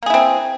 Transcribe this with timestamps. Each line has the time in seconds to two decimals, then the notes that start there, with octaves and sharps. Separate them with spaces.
0.03 A#3
0.06 G#4
0.10 E4
0.14 C4